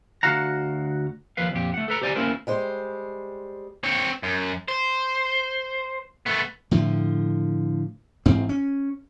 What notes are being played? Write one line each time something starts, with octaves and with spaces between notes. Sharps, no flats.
D2 F#4 F5 F#5 A#5
D#2 F3 B4 F5
F2 A#2 G4
A3 F#5
A4 B4 A#5
G4 C5 D5 G5 G#5 A#5
A#3 C#4 E4 F4 A#4 C5
G3 G#3 C5
C4 C#5
F#2
C5
A3 B3
A2 D3 F3
A1 G#2 C4
C#4